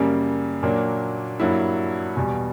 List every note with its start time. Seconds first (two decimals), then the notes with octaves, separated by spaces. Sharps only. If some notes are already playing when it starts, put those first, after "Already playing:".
Already playing: F#2 C#3 G3 A#3
0.63 A#2 F#3 A#3 D4
1.40 G2 F#3 A#3 E4
2.16 E2 B2 G3